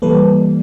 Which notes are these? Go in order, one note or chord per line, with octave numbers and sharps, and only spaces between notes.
E3 G3 A#3 A4 B4